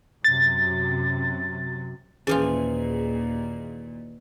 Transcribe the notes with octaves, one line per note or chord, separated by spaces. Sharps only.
F#2 C3 F#3 A6
D#2 A#2 E3 F3 C#4 F4 G#4